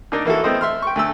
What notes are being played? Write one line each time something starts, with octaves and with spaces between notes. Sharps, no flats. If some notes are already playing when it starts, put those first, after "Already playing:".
D3 A#3 D4 D#4
E3 A#3 E4 F#4 A4
A3 B3 C4 E4 C5 D#5
E5 C6 F6
G5 C#6
D2 A3 E6